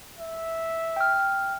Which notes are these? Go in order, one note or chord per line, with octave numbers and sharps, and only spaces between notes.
E5
G5 F6